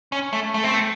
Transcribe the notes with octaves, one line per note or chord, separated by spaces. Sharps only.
C#4
A3
A3
C4
A3